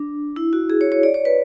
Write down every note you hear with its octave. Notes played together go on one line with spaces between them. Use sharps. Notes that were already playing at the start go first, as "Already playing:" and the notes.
Already playing: D4
E4
F#4
G#4
C#5
C#5
D5
C#5
B4